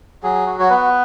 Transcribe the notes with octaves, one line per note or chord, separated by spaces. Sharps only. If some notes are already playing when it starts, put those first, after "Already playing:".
F#3 G#4
F#4
C#5
B3 B4